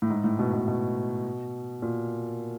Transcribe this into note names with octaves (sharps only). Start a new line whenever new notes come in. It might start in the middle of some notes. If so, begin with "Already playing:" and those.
A2
G#2
A2
B2
B2
B2
A#2